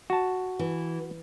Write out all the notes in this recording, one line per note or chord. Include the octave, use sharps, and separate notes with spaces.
F#4 A5
E3